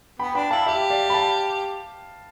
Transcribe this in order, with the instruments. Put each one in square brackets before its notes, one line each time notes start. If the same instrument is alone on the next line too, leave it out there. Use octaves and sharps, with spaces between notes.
[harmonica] B3 [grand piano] G5 B5
[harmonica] D4 [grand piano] G5 B5
[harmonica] E4 [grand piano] F5 A5
[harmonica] G4 [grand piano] E5 G5
[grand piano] D5 F5
B5
F5 A5